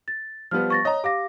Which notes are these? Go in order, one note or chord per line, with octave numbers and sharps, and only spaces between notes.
A6
F3 G3 B3 F6
C#6 A6 A#6
C#5 D#5 A#5
G4 F5 D6 A#6